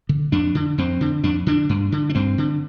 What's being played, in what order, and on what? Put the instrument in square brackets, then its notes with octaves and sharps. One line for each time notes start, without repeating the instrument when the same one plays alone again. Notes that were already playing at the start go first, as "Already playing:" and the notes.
[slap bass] D3
F2 D4
D3
F2 C4
D3
F2 D4
D3 D4
G2
D3
D4
G2 C4
D3